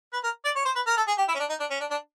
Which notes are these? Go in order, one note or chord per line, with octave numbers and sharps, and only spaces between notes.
B4
A#4
D5
C#5
C5
B4
A#4
A4
G#4
G4
E4
C#4
D4
D#4
D4
C#4
D4
D4